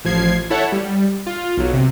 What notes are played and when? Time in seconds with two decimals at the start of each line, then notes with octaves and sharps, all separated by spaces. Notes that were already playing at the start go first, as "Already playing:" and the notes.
0.04 A1 F3 G#6 C7
0.50 E4 A4 C#5 F#5
0.72 G3
1.26 F4
1.57 B1 F#3
1.73 C3